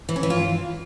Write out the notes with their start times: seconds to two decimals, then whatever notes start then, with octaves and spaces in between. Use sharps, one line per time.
0.09 E3
0.16 C#4
0.23 E3
0.30 F4